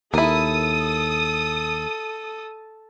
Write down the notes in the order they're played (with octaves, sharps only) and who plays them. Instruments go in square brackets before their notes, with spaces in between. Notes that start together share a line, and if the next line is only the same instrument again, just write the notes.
[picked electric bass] D#2 [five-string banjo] E4 A#4 [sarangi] A4 [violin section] D#6